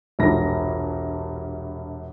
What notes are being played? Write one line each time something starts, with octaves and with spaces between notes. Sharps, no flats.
E1 A#1 G2 A#6